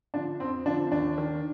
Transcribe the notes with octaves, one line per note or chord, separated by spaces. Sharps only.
D3 F3 D4
F2 C4
D3 F3 D4
D#2 D4
D#3